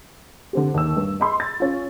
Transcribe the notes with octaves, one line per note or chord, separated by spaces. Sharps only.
D3 C4 G4
D#2 E6
G2
D#5 B5 C6
A6
C#4 F4